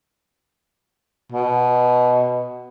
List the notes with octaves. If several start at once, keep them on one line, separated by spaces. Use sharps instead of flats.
B2